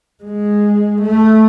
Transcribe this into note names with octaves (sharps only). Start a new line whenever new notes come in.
G#3
A3